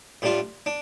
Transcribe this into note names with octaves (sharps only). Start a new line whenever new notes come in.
A2 G3 D4 F4
D4